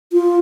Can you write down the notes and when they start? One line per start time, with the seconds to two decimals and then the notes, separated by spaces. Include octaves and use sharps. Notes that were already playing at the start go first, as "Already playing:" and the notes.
0.13 F4